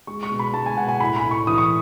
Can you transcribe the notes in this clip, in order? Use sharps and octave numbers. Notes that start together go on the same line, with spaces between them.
G#3 C#6
C#6
B2
B5
G#3 A5
G#5
B2 F#5
G#5
A2 B5
B5
A2
C#6
E3 D#6
C#6